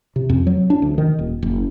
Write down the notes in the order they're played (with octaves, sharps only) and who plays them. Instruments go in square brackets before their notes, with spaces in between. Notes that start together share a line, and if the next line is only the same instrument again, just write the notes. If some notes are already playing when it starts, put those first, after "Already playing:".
[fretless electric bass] C3
F2
F#3
D4
D2
D#3
D#1
F#1